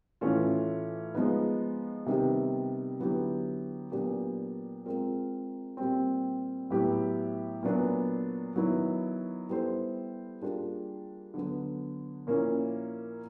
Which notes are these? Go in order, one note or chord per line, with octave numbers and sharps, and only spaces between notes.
A2 E3 A3 C#4 F4
F3 G#3 B3 D#4
C3 D#3 G3 B3
D3 F#3 B3 E4 G4
A#2 F#3 B3 D4 G4
G#3 C4 F4 A#4
A#2 G3 C4
A2 F#3 B3 E4 G4
A#2 F#3 B3 D4
D#3 F#3 B3 E4
G3 B3 E4 A4 C5
G3 A#3 D4 F4 G#4
D3 F#3 B3
A#2 F3 A#3 C#4 E4